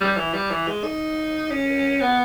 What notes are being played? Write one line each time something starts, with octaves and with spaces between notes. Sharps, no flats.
G3
E3
G3
E3
G#3
D#4
C#4
B3